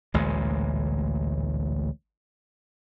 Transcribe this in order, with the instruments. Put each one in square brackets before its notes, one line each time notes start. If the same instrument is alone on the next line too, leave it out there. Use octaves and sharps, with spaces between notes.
[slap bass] A1 D2 A#2 G#3